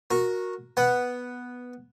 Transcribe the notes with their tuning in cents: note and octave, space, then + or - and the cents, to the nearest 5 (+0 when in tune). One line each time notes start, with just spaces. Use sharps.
F#4 -15 A#4 +0
B3 +0 F#5 +0